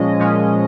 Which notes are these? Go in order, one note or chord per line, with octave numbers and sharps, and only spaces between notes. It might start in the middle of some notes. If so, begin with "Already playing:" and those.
Already playing: A#2 F3 G#3 C#4 D#5
A#2 F3 G#3 C#4